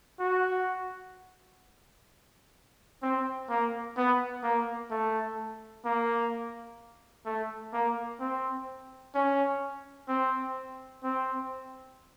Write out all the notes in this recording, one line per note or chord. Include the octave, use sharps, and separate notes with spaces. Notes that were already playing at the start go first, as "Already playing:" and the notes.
F#4
C4
A#3
B3
A#3
A3
A#3
A3
A#3
C4
C#4
C4
C4